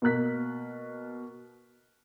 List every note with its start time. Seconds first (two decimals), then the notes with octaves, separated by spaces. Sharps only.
0.02 B2 A#3 A#4 F#6 B6